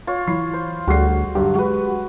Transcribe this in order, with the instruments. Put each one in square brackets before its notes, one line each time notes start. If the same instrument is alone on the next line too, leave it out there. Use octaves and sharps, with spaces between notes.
[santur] F4 C#5
[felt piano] E3 B5 C7
[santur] C5
[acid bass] D2 [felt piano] G3 G#4 C7 [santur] F#4
[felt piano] G2 D3 F#3 [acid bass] G4
[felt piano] G#3 [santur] F#4 B4